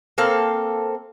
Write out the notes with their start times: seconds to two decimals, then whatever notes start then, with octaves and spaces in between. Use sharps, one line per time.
0.18 A#3 C4 A4 F5